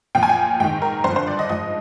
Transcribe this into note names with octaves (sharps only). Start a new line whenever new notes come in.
A#2 F3 G5
G#5
G5
G#2 D#3 G5
A#4
G2 D3 F3 C5
C5
D5
D#5
G#2 F3 D#5